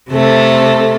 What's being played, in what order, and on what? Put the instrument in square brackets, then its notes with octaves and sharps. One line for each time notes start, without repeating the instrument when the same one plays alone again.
[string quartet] C3 A3 A4